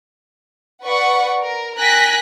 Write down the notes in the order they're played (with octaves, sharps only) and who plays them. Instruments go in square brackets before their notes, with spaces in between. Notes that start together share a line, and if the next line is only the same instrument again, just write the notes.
[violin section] B4 D5 F#5 C#6
A#4
A#4 G5 G#5 F#6 A#6 B6